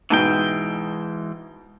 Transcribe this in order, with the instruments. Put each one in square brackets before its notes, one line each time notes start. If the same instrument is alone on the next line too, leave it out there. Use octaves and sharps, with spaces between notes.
[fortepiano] G#2 B2 [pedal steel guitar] E3 G#3 G5